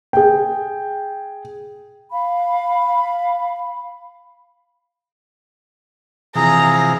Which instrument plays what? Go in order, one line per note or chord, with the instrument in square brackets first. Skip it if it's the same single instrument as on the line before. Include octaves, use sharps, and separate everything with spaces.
[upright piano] G#4 G5
[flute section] F5 B5
[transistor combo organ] C3 E3 F3 [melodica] G#4 [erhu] A#5